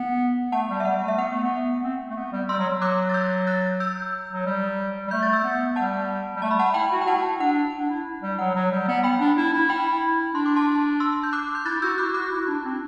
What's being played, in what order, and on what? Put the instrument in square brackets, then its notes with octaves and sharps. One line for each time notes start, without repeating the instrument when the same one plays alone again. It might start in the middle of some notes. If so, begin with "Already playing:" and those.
Already playing: [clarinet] B3
[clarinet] A3 [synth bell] F#5 A5
[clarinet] G3
[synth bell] E5
[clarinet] G3 [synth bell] F#5
[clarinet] A3
[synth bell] E5
[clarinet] B3 [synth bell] F#5
[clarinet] A3
B3
C4
A3
B3
G3
[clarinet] G3 [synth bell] C6 E6
[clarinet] F#3
[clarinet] F#3 [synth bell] D6 F#6
[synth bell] A6
E6 G6
F#6 A6
E6 G6
[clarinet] F#3
G3
G3
[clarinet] A3 [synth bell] G6
[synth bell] A6
E6 G6
[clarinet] B3
[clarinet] G3 [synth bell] F#5 A5
[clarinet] G3
[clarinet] A3 [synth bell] A5
[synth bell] B5
F#5 A5
[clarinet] E4 [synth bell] G5 B5
[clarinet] F#4
[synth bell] G5
[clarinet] E4 [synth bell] F#5 A5
[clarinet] D4 [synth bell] F#5
[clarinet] D4
E4
G3
[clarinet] F#3 [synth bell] F#5
[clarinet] F#3
G3
B3
[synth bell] G5 B5
[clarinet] D4
E4
E4
[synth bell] G5 B5
[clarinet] D4 [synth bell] C6
[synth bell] D6
A5 C6
C6 E6
G6
D6 F#6
G6
[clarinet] E4 [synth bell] F#6 A6
[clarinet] E4
[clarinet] F#4 [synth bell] E6 G6
[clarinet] E4 [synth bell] D6 F#6
[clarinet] F#4 [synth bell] D6 F#6
[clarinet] E4
D4
D4
C4